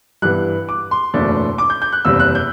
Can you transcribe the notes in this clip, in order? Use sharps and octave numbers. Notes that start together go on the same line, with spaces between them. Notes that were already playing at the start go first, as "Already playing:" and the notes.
G2 E3 B3 F#6
D6
C6
F#1 E2 B2 A3 D4
D6
G6
G6
F#6
F#1 E2 C3 G3 E6
F#6
G6